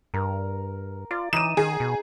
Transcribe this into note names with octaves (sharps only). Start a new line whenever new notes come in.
G2 A#4
F4 D5
E3 D#4 D#7 E7
D#3 G#4
B2